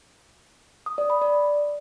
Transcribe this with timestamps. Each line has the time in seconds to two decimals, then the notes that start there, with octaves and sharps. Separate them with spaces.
0.86 D#6
0.98 D5
1.10 B5
1.21 D5